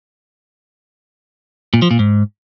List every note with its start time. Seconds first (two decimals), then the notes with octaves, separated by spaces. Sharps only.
1.74 A#2
1.82 F3
1.91 A#2
1.99 G#2